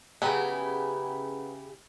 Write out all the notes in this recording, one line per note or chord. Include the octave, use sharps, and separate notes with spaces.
C#3 F#3 B3 E4 G4